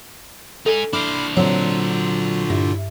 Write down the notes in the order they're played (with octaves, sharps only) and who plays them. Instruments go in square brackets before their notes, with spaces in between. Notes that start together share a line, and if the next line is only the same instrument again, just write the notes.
[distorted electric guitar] D#4 G#5 [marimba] A4
[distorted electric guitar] D4 C5 [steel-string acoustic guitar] E4 [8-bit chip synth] B5 D6 F6
[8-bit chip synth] A#2 D3 F4 [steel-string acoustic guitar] F#3 C4 [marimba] C#5
[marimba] G2 [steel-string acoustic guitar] E4